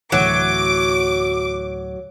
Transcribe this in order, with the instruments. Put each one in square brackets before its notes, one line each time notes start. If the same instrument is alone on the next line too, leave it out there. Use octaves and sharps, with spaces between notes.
[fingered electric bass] D2 A2 E3 [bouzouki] F#3 [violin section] D6